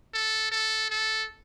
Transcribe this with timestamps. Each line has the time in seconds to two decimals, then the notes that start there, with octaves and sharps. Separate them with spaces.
0.14 A4
0.52 A4
0.90 A4